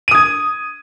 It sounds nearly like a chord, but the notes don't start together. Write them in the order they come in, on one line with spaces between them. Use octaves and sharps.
D#7 D#6 G#6